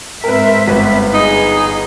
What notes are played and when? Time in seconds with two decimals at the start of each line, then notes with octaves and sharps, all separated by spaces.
0.24 G#2 C4 A#4 B4 E5
0.67 G1 B4
1.14 D#4 G#4